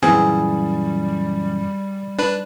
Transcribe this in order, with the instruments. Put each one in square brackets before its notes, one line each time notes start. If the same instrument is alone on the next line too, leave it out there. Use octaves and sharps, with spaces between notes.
[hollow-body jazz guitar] F#2 A#2 E3 [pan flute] G3 [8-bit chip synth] C4 [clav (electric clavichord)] G#4
[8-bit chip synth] D4 B4